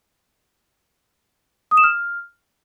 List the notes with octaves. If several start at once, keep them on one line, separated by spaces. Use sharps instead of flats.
D#6
E7
F6